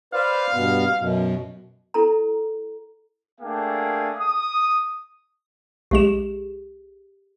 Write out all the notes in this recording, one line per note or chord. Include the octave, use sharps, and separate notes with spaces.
B4 C5 D5 F5
G2 B2 B3
F#2 B2
E4 A4 A#5
A3 A#3 D4 G#4 F5 G5
D#6
B1 G#3 G4 G#4 E7